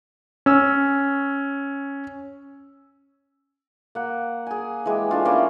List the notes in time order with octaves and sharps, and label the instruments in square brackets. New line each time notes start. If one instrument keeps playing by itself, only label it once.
[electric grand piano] C#4 E6
[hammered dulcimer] A#3 F#5
G#4 G#5
E3 G#3 G4
A3 D4 F4
E3 A#3 C#4